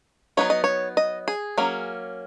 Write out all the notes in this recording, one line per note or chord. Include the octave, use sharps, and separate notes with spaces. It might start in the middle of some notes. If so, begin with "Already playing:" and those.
F#3 B3 D#4 C#5
D#5
C#5
D#5
G#4
F#3 A#3 C#4